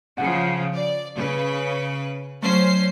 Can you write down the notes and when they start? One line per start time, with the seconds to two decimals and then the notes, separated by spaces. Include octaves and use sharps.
0.18 C#3 F3 F#5
0.75 D5
1.16 C#3 B4
2.43 F#3 A3 C#4 C5 C7